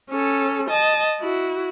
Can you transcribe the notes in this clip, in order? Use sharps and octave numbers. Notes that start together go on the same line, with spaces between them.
C#4 A4
D#5 A5
E4 F#4